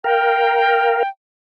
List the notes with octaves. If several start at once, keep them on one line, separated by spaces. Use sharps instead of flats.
A#4 F5 G5